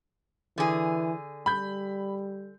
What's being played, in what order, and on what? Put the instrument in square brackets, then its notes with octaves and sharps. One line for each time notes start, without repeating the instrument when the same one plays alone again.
[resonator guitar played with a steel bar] D3 G#4 [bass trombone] E3
[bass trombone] G3 [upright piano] B5 G6